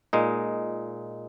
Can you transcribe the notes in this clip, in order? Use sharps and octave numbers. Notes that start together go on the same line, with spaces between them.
A#2 G#3 D#4